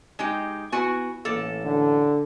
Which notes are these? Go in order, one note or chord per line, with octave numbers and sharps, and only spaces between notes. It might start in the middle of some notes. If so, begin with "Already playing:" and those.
G#3 D#4 G4
B3 E4 F#4 G#5
A1 A#3 A4
D3